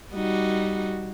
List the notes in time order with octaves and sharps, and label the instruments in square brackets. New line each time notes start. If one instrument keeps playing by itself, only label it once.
[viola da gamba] G3 D#4 F#4